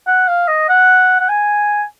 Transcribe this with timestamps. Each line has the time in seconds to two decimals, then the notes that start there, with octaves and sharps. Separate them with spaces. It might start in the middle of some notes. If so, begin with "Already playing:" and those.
0.07 F#5
0.28 F5
0.48 D#5
0.69 F#5
1.20 F#5
1.29 G#5